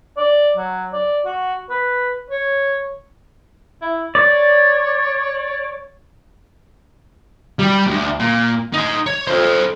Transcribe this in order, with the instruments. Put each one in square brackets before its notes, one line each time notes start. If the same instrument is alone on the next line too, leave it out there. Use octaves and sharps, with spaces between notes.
[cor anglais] D5
F#3
D5
F#4
B4
C#5
[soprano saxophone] E4
[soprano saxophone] C#5 [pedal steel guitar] D5
[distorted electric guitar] G3 G4
D2
A#2
D#4 C6
C#5
A4 C5